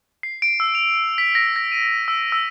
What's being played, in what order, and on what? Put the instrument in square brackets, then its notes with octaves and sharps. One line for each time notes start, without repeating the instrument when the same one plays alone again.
[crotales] C7
D7
E6
F7
B6
A#6
A#6
D#7
E6
E6